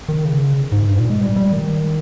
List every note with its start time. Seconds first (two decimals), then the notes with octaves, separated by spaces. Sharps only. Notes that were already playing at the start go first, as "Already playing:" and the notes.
0.09 D#3
0.25 C#3
0.72 G#2
0.89 G2
0.99 A#2
1.10 G#3
1.21 G3
1.36 G3
1.52 D#3